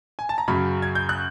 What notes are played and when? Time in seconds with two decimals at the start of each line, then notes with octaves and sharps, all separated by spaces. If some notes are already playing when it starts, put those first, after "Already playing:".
0.19 G#5
0.29 A5
0.38 A#5
0.48 F#2 C#3 F#3 B5
0.82 G#6
0.95 G6
1.09 F#6